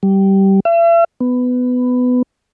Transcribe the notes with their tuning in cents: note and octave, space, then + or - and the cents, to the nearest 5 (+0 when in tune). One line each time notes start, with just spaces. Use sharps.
G3 -15
E5 +40
B3 +15